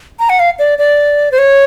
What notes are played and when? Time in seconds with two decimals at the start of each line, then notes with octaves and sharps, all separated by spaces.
0.20 A#5
0.29 F#5
0.40 F5
0.59 D5
0.79 D5
1.32 C5
1.38 C#5